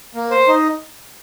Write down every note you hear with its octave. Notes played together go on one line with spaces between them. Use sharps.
A#3
C5
D#4